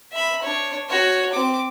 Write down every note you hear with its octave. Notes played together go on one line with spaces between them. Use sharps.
E5 B5
D4 C#5
F#4 C#5
C4 D6